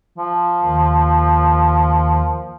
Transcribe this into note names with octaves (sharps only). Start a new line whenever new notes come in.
F3
D#2 D#3